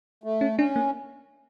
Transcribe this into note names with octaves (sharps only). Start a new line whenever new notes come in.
A3
C#4
C#4 D4
A#3